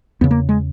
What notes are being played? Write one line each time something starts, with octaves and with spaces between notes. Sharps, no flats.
E2 C#3 B3
A#3
G#3